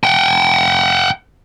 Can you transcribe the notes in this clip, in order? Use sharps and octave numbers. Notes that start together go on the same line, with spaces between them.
F#5 G5